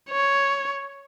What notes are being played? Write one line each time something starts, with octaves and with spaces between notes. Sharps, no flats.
C#5